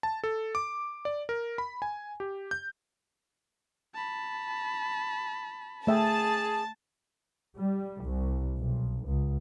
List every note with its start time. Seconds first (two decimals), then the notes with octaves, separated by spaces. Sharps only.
0.03 A5
0.24 A4
0.55 D6
1.05 D5
1.29 A#4
1.58 B5
1.82 G#5
2.20 G4
2.51 G6
3.94 A5 B5
5.87 A3 G#4 E5 G5 A5
7.58 G3
8.03 C2
8.59 B1
9.07 C#2